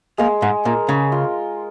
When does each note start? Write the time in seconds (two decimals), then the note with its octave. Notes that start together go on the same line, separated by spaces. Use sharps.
0.18 G#3 A#3
0.42 G#2
0.65 A#2 A#4
0.89 C#3
1.12 F4